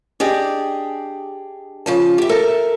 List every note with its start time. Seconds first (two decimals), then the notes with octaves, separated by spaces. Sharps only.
0.20 D4 G4 G#4 D#5
1.86 C#3 F3 A5
2.18 G4 E5
2.29 A4 A#4 E5 A5